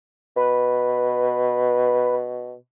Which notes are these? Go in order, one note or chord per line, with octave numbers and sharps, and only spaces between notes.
B2 B4